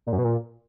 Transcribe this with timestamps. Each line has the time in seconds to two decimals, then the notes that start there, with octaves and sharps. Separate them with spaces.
0.07 A#2
0.12 F#2
0.18 B2
0.24 A#2